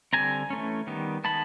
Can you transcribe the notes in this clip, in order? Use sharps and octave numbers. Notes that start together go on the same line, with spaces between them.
D3 G3 C4 G#5 A#5
E3 A3 C#4
D#3 G3 B3
D#3 G#3 B3 A5 B5